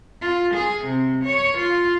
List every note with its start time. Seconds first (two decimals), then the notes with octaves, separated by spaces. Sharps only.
0.22 F4
0.54 G#4
0.84 C3
1.24 C#5
1.57 F4